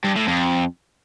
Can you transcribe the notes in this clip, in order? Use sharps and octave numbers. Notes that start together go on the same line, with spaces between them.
G2
A2
F2